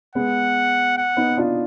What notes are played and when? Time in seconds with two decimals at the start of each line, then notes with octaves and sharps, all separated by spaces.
0.15 G#3 B3 F#5
0.97 F#5
1.17 B3 D#4
1.37 D4 F4